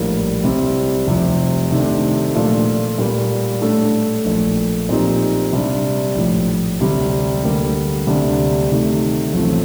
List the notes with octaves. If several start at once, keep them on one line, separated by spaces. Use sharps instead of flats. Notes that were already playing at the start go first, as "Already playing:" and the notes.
Already playing: A#1 A2 G3 A#3
C2 C3 G3 C4
F1 F2 C3 F3
C3 D#3 A3 D4
A#2 F3 A3 D4 F4
A#2 G3 A#3
A2 A3 D4 A4
A#1 A#2 A3
A#2 F3 C4 D#4 G4
C3 G3 D4
A#1 A2 F3
D2 C3 G3
D2 D3 G3 A#3
D2 C3 G3 D4
C3 D#3 A3
A1 A2 F3 A3 C4